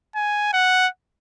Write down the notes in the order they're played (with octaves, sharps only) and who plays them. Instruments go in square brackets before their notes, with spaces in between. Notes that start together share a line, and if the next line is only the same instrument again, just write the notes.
[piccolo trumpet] G#5
F#5